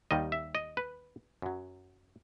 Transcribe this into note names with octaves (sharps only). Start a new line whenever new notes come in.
D#2 D#3 G3 D#5
E5
D#5
B4
F#2 F#3